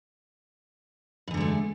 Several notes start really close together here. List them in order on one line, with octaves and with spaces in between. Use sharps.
G2 E2 D3 G#3 A3